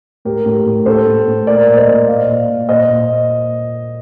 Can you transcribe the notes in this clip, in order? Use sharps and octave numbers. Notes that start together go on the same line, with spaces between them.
A2 G4 A#4
A2
A2
A2 A4 C5
A2
A2
A#2 A#4 D5
A#2
C5 D#5
A#2
A#2 D5 F5
A#2
A#2
A#2 C5 D#5
A#2